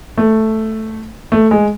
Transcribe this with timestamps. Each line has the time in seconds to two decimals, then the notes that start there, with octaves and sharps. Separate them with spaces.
0.18 A3
1.32 A3
1.51 G#3